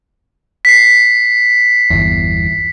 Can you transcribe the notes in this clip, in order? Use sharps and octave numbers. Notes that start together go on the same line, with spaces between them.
B6 C7
G1 E2